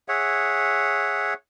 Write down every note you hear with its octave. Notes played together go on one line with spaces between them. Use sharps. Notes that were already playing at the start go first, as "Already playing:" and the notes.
G#4 C#5 E5 F#5